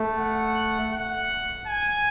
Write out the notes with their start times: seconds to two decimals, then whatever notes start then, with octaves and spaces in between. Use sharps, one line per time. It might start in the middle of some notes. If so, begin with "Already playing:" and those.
Already playing: A3
0.18 F#5
0.93 F#5
1.67 G#5